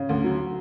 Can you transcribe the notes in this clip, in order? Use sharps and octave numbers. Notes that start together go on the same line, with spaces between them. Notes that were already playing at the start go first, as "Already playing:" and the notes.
Already playing: C#3
D2
F#3